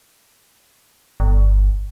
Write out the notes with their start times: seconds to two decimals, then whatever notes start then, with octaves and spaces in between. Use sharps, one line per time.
1.20 G1